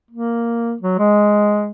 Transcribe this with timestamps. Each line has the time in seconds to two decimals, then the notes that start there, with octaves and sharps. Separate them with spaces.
0.11 A#3
0.81 F#3
0.98 G#3